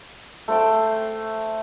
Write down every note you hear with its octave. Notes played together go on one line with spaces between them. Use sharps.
A3 C5 G5